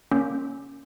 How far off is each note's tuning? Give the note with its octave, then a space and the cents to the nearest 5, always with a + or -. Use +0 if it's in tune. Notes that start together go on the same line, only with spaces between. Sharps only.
A#3 +0 C#4 +0